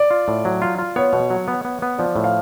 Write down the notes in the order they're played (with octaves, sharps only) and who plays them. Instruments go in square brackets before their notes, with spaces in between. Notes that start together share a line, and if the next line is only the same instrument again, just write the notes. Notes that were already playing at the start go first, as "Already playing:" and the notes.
Already playing: [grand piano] D5
[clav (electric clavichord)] F4
A2
F#3
F4
F4
[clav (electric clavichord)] B3 [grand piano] C#5
[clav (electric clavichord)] B2
F#3
B3
B3
B3
[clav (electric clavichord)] F3 [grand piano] D5
[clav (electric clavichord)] A2
[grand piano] F5